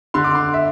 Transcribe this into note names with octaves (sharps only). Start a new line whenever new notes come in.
D3 C6
D6
C6
E5